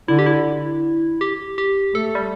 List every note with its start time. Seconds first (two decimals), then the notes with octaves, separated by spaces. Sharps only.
0.08 D3 E4
0.19 G4
0.26 E4
1.21 G4
1.58 G4
1.95 A3 A4
2.15 G3